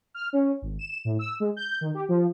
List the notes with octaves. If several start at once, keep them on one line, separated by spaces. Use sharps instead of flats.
F6
C#4
G#1
E7
A2
E6
G#3
G6
D#3
G4
F3